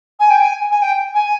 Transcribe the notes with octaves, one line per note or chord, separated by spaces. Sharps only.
G#5
G5
G#5
G#5
G5
G#5